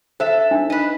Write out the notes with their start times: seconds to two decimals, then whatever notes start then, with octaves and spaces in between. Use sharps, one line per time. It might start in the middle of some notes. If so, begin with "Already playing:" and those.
0.20 A4 C5 E5
0.51 D4 D#4
0.70 B4 D#5